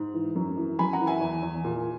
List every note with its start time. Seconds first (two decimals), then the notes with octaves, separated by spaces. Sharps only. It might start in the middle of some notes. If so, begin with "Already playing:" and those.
Already playing: G#2
0.14 E3
0.36 F#2
0.57 E3
0.79 F#2 G#5 B5
0.93 F#5 A#5
1.00 E3
1.07 E5 G#5
1.21 E2
1.43 E2
1.64 A#2